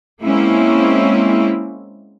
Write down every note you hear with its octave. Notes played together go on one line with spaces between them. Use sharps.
G#3 A#3 C4 C#4 E4